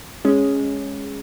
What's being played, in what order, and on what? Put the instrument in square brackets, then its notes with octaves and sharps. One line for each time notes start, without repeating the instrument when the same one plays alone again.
[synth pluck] G#3 C#4